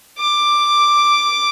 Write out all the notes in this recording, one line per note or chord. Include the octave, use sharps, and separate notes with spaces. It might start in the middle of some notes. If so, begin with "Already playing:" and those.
D6